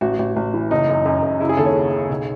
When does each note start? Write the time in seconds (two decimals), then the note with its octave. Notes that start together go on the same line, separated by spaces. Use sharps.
0.01 A1 F#4
0.19 A1
0.36 A1
0.54 E3
0.70 F#1 D#4
0.89 F#2
1.05 F#2
1.22 F#2
1.40 C#3 E4
1.49 G#4
1.57 D#2 A4
1.66 C#5
1.75 C#3
1.93 C#3
2.10 B1